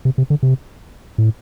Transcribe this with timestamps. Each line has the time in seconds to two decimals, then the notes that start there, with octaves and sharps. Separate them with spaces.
0.05 C3
0.18 C3
0.30 D3
0.43 C3
1.18 A2